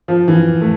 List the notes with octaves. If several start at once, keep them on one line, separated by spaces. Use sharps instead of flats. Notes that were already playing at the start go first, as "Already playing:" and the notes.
F3
E3
A3